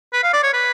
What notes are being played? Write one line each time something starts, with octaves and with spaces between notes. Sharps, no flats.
B4
F5
D5
C#5
B4